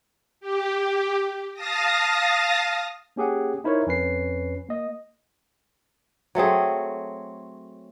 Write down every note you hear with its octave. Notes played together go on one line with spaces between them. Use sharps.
G4
F5 A5 D#6 A#6
A#3 C#4 G4 G#4 F#5
D#4 E4 A#4 C5 C#5
F2 C#4 B4 C7
A#3 D#5
F#3 A3 C4 G#4